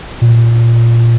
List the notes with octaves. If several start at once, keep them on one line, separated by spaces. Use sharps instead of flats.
A#2